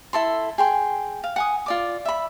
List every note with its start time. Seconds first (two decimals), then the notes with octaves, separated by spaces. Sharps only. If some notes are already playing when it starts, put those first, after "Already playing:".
0.13 E4 A4 C6
0.58 G#4 G5 C6
1.24 F5
1.36 F#5 G#5 D#6
1.66 F4 D5 D6
2.05 E5 B5